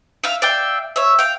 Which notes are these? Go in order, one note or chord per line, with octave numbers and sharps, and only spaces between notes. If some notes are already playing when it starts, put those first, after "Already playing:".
E5 F5
D5 E5 F5 G5
C#5 E5
F5 G5